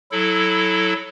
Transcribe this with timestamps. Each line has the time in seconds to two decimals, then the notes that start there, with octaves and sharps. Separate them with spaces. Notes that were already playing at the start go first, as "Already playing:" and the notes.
0.12 F#3 E4 A4